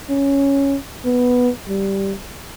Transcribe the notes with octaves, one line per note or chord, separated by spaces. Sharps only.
C#4
B3
G3